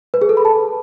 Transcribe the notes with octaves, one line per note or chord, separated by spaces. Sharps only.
B4
G#4
A4
B5
A5